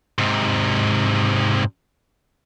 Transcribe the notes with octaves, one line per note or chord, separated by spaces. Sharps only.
G#2 C3